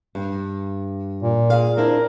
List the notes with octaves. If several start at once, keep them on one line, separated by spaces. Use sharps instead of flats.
G2
A#2
G#4 F5
C4 D4 E4 A#4